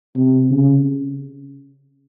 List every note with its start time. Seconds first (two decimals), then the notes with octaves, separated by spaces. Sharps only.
0.16 C3
0.50 C#3